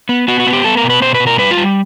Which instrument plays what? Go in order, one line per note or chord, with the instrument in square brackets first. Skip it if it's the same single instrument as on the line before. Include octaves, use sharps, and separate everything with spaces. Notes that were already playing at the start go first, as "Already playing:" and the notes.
[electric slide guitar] B3
B3 F#4
F#4
B3
G4
B3 A4
A#4
B2
B4
B2 C5
B4
B2
A#4
G3 B4
F4
G3